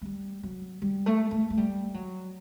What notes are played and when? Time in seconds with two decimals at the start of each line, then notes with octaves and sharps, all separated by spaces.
0.02 A3
0.05 G3
0.43 F#3
0.82 G3
1.06 A3
1.31 A3
1.50 A3
1.57 G3
1.94 F#3